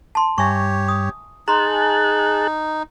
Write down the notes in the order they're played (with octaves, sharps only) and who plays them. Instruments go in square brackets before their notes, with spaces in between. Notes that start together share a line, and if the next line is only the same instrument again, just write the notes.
[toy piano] A5 C6
[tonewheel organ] G2 [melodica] G4 C#5 [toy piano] E5 G#5 C#6
[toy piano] D#6
[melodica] D#4 [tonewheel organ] G#4 A5 F#6 [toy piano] A#5 C6